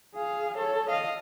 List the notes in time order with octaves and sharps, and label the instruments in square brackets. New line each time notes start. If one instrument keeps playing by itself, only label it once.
[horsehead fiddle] G#4 F5
A4 C#5
D#5 F5